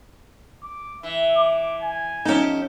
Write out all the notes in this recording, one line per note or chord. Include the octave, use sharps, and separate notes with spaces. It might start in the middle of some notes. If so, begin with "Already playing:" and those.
D6
E3 E5
D6
G#5
F3 C#4 D#4 G4 A4